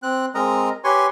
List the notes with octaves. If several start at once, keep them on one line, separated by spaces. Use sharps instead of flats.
C4 F#6
G#3 C4 A#4 D#5 A#5
G4 B4 C#5 G#5 C6 C#6